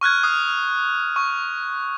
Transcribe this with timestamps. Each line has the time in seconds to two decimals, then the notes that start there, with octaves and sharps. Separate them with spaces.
0.01 C#6 F6 F#6 G#6
0.24 D#6 F6
1.16 C#6